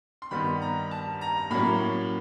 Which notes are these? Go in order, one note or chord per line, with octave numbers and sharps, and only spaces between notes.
C6
G2 D#3 G3 B3 B5
A#5
A5
A#5
A2 F#3 A#3 C#4 B5